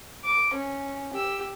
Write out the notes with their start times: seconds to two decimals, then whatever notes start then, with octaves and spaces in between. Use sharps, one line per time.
0.24 D6
0.54 C#4
1.13 G4 E6